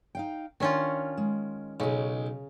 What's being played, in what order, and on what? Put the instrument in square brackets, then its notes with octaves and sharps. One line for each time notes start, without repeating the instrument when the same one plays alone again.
[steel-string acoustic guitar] D#4 F5 G5
[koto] D#3 C#4 F4 [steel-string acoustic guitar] D4 C#5
[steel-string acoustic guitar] G#3
[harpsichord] B1 [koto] C#3 [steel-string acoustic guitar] D#4 G#4